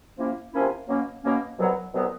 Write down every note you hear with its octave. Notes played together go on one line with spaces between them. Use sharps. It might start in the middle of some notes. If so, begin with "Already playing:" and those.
C3 F3 A#3 C#4 E4
C3 F3 A#3 C#4 E4
B2 F#3 A#3 C#4
B2 F#3 A#3 C#4
C2 B2 F#3 B3
C2 B2 F#3 B3